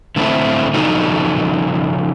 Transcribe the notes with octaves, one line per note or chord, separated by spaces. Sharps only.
D3 A3 B3 C4 E4
C#3 F3 D4 D#4 F#4 A4